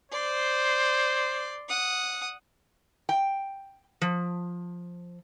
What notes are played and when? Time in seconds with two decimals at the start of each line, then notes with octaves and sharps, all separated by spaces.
0.12 C5 D5 C6
1.68 F#5 D#6
3.09 G5
4.01 F3